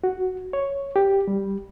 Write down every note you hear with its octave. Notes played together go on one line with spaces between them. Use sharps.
F#4
C#5
G4
G3